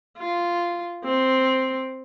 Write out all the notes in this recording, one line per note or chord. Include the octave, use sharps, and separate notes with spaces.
F4
C4